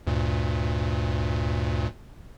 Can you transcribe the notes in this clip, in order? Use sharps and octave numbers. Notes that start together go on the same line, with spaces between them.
D2 G2 A#2